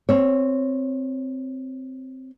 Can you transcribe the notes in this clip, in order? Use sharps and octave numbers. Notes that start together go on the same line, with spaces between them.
C4 C#5